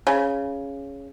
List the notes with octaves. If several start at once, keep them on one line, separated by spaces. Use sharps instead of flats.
C#3